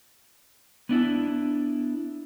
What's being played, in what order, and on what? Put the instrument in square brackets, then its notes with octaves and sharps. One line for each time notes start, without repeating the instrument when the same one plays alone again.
[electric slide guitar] B3 D4 E4